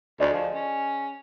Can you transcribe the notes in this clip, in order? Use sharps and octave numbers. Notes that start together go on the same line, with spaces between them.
D2 G#4 D5 D#5
F3
C#4